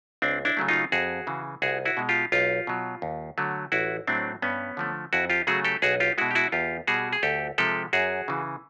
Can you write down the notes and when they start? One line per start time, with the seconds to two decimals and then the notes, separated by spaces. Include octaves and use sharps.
0.22 C#2 C4 D4
0.45 D4 E4
0.57 C#3 F#3 A3
0.68 D#4 F4
0.92 F2 F#4 G#4
1.27 C#3 E3
1.62 C2 F#4 G#4
1.85 E4 F#4
1.97 B2 G#3
2.09 F4 G4
2.32 B1 F4 G4
2.67 B2 F#3
3.02 D#2
3.38 D3 F#3 A3
3.72 A1 E4 F#4
4.07 A2 F#3 A3 C4 D4
4.42 G2 B3 C#4
4.77 D3 F3 A3
5.13 F2 E4 F#4
5.30 F4 G4
5.47 C#3 F#3 A3 F#4 G#4
5.65 G4 A4
5.82 B1 F#4 G#4
6.00 F4 G4
6.18 B2 G#3 E4 F#4
6.31 G4
6.35 E4 F#4
6.52 E2 F4 G4
6.87 B2 G3 F#4 G#4
7.13 G#4
7.23 D2 G4 A4
7.58 C3 F3 G#3 G4 A4
7.93 F#2 F#4 G#4
8.28 C#3 E3